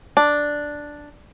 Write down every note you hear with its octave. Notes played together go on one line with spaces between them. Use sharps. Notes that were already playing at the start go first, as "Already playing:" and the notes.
D4